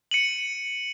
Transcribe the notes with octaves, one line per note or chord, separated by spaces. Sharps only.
C#7 D#7 F#7